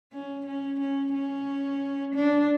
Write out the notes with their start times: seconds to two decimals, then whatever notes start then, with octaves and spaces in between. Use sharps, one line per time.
0.13 C#4
0.46 C#4
0.80 C#4
1.14 C#4
2.15 D4